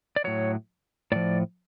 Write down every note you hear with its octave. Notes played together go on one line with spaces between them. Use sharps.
D5
A2 F#3 C#5
A2 F3 D5